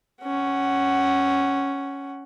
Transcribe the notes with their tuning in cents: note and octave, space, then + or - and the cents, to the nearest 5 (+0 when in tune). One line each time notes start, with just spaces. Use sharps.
C#4 +0 F#5 +15